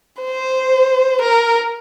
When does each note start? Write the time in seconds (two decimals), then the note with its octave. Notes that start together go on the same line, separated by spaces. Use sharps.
0.22 C5
1.21 A#4